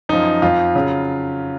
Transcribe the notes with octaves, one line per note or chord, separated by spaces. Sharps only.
F#2 F3 D#4
F2 F3 F4
C#3 F#3